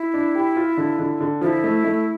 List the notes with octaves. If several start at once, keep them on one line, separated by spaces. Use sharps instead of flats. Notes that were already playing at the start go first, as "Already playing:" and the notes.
Already playing: E4
D4
G4
F4
D3
D3
D3
F3 E4
A3
A3